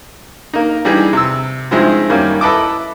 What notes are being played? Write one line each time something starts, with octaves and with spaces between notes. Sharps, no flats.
A#3 D#4
E3 G3 D4 D#4 G#4
C3 E6
G2 F3 G#3 C4 D#4 E4
F#2 D#3 G3 A#3 C#4
E4 A4 B4 D#5 A5 D6